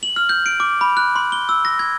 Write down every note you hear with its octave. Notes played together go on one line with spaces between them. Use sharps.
F#7
F6
G6
D7
D6
B5
F#6
C6
G7
E6
A#6
G#6